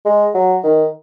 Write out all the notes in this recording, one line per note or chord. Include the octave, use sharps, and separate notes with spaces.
G#3
F#3
D#3